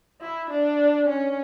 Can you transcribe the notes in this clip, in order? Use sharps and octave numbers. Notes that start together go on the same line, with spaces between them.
E4
D4
C#4